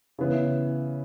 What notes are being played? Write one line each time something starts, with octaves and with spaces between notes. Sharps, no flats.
C#3 E3 B3 E4